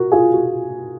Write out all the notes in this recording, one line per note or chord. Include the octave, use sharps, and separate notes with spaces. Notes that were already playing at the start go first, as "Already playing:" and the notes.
Already playing: F#4 A#4
F4 G#4
F#4